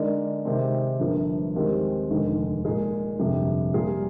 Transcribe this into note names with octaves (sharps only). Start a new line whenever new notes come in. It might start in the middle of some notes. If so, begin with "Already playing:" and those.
Already playing: D3 G#3 D#4 A#4 D5
C3 D#3 G#3 C4
G1 G2 F3 A#3
D#2 D#3 G#3 C4 G4
F1 D#2 D3 G#3 D#4
A#2 G#3 D#4 G#4
G1 F2 C3
A#2 G3 A#3 F4 G#4